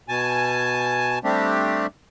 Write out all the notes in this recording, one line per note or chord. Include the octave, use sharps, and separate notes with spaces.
B2 G#5 A5
G3 A3 C4 D4 G4